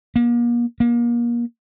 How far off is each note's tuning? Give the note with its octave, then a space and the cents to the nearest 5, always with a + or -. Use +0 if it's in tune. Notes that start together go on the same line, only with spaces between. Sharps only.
A#3 +40
A#3 +30